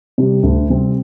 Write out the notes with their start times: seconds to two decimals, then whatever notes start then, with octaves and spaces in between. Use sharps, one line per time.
0.18 C3 G3 C4
0.43 D2
0.70 C3 G3 C4